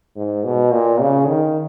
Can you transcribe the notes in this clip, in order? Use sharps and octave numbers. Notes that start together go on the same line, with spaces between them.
G#2
B2
A#2
C#3
D#3